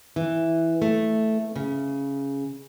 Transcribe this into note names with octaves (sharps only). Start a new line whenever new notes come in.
E3
A3
C#3